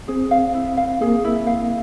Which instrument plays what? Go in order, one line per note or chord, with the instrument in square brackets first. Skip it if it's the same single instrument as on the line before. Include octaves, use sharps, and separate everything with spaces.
[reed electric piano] C4 [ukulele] G#4
[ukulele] F5
E4
F5
[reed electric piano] A#3 [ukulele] G#4
[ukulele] E4
F5